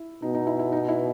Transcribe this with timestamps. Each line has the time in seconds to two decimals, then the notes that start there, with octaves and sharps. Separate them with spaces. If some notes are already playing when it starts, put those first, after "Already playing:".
Already playing: E4
0.22 B2 D#4
0.34 D#4
0.47 E4
0.59 E4
0.72 D#4
0.89 E4